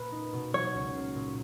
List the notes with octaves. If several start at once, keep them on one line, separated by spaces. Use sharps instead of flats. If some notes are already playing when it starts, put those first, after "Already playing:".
Already playing: A#2 A#3 B4
D#4
B2
F#3 C#5
C#2
A#3
A#2